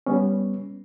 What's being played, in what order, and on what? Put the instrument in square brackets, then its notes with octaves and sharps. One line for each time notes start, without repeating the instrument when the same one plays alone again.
[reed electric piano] G3 B3 C#4